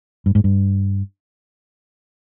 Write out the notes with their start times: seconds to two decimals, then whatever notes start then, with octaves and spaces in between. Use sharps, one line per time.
0.26 G2
0.35 G#2
0.44 G2